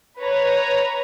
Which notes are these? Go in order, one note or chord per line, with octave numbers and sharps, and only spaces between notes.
B4 C#5 A#5